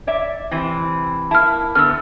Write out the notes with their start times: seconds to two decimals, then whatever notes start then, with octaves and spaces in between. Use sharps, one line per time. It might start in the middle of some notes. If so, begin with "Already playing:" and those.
0.07 C#5 D5 E5
0.51 C3 E3 C4
1.31 A#3 E4 A5 F6
1.75 F2 D3 B3 E6 F6